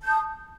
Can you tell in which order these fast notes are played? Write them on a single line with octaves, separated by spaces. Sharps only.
A5 G6 D#6